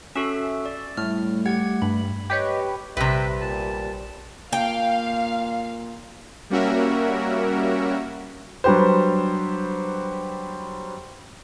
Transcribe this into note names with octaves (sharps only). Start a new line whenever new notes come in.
C#4 F#4 A4 E5
D5
A2 G3 A3 F6
G4 F#5 G#6
G2 B5
G4 B4 C#5 D#5
A#1 C3 G3 B4 E5 G5
A#2 A5
A#2 F5 G5
G3 A#3 C#4 F#4 A#4 E5
F#3 G3 D4 G4 B4 C5